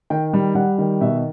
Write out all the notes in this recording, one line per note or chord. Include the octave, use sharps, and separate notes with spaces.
D#3 G5
G3
G3 F#5
D#3
B2 E5